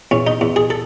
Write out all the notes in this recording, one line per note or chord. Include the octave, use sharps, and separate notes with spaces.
E2 C#4
D#4
E2
G#4
A4